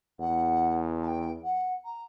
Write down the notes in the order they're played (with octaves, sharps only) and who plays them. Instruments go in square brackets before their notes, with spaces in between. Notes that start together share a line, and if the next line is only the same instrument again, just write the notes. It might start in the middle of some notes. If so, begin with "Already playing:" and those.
[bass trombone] E2 [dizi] F#5
[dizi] A5
G5
F#5
A#5